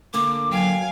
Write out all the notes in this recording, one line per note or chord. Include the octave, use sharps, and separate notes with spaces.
D3 A#3 D4 D6
F#3 F5 G5 G#5